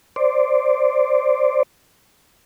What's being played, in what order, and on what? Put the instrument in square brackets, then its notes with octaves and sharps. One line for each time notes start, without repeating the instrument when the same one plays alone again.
[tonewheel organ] C5 D5